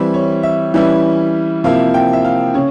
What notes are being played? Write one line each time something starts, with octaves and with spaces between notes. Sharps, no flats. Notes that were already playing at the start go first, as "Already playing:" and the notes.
Already playing: E3 G3 C4 E4 E5
C#5
E5
E3 G3 C#4 E4
C3 F3 A#3 E4 F5
G5
E5
F5
C#3 C#5